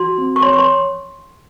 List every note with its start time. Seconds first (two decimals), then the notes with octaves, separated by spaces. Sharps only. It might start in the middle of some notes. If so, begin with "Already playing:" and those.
Already playing: F#4 C6
0.18 C4
0.36 C#6
0.42 C#5 C6
0.53 C#6
0.59 C6